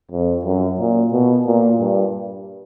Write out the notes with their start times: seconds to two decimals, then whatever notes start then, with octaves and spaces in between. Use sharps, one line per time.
0.11 F2
0.45 F#2
0.79 A#2
1.13 B2
1.46 A#2
1.80 G2